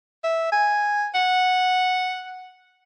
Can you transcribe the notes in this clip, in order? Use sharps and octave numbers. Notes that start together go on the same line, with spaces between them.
E5
G#5
F#5